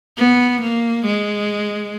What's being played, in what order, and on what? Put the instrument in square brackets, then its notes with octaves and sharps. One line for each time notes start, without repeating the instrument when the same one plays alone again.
[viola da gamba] B3
A#3
G#3